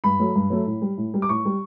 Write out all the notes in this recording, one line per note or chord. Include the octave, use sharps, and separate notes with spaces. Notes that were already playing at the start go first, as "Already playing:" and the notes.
G2 B5
F#3 A3
G2
F#3 A3
A2
G3
A2
G3
D6
A2 C#6
G3